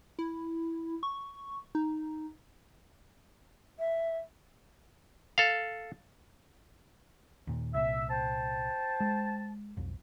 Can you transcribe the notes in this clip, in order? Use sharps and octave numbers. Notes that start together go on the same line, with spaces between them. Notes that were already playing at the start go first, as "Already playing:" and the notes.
E4
C#6
D#4
E5
A4 F5
D#2 A#2
C2 A#2 E5
C5 G5 A5
G#3
B1 F2